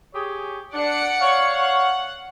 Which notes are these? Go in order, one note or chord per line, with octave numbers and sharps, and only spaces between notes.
G4 G#4 C#5
D4 D5 F#5 C#7
C#5 F5
F#5